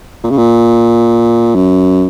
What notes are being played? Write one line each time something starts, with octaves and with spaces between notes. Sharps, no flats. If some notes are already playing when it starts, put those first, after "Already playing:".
A#2
C#3
A#2
F#2